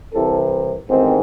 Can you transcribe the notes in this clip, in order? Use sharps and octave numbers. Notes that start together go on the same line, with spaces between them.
C2 C3 E3 A4
A1 G#2 D#3 C4